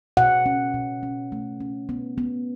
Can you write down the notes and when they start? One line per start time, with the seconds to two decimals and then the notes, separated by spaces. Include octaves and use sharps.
0.17 B2 F#5
0.46 C#4
0.74 B2
1.03 C#4
1.32 A3
1.60 C#4
1.89 B3
2.18 B3